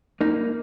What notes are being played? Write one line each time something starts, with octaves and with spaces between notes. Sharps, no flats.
A#3 D#4